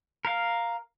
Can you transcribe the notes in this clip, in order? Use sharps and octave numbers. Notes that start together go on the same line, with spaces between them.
A#4 F5